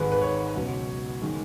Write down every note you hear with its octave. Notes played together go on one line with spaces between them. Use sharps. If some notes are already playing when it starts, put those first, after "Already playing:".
Already playing: G#1 G#2 D#3 G#3 B4
B4
C#5
C#2 B2 F#3
D#3 G#3